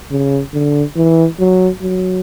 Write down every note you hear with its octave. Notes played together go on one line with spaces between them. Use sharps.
C#3
D3
E3
F#3
F#3